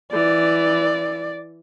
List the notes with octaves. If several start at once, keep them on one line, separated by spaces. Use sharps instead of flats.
E3 D5